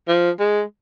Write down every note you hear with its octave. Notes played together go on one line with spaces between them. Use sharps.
F3
G#3